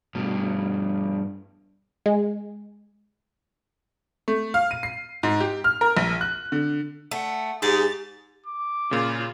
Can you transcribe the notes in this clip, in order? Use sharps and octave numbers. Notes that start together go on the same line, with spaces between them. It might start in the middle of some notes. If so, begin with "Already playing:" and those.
G2 B2
G#3
A3
F5
D#7
C7
G#2
G4
F6
A#4
A#1
F#6
D3
A3 F#5
G#2 G4 G#4 A6
D6
A#2 C#3 F4